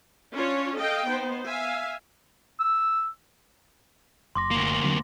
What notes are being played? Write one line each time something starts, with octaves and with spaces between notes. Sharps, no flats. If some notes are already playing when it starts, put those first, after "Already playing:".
C#4 D4 F4 C#5
A4 D#5 F5 G5
B3 D#4 C5
E5 F5 G#5
E6
F#1 C6 D6 A#6
D2 A#3
D3 F#3 C4